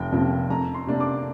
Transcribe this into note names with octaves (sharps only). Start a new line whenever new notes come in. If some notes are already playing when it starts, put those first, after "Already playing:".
Already playing: F1 G5
F2 C3 F3 A#3
F2 A#5
C6
C3 A#3 D4
D6